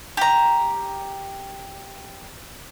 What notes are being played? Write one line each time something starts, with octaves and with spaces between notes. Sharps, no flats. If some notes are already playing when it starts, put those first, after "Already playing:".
G4 A#5